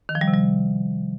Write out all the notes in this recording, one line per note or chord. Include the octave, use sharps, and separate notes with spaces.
D#3
F3
G3
C3
G3